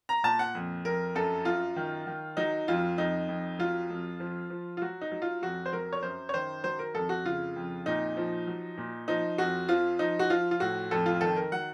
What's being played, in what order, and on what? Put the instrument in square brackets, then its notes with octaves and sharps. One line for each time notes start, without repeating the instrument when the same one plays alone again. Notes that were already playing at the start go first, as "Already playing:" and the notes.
[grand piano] A#5
A#2 A5
F#5
F2
F2 A#4
F#2 A4
F#2 F4
D#3
D#3
F#3 D#4
F2 F4
F2 D#4
F2
F#3 F4
F2
F3
F3
F4
F#3 F#4
D#4
F#3
F4
F2 F#4
C5
F#3 A#4
C#5
F#2 C5
C#5
D#3 C5
F#3 C5
A#4
F2 A4
F#4
C#3 F4
F2
A#2 D#4
F3
F#3
A#2
F3 D#4
F2 F#4
F3 F4
F3 D#4
F#4
F3 F4
F4
A2 F#4
F2 A4
F4
D#3 A4
A#4
F#3 F#5